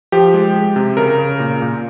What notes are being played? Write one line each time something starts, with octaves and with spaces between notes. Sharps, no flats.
F3 G4
G#3
G#3
C3
C#3 A#4
C#3
A#2
A#2